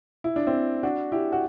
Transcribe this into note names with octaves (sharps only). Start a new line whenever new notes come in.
E4
D4
C4 E4
D4 F#4
E4 G4
F#4